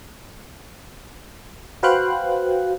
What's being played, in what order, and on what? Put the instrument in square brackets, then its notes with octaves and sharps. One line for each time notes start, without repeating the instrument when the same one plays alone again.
[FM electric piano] F#4 B4 C5 F5 G5 F#6